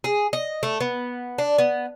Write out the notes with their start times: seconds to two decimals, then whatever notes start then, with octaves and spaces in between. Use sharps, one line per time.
0.04 G#4
0.33 D#5
0.63 A3
0.81 B3
1.38 D4
1.58 B3